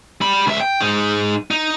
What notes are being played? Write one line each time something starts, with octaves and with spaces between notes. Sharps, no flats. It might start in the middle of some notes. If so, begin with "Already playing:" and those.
G3 B5
C#2 E5
G5
G#2 D#4
D#4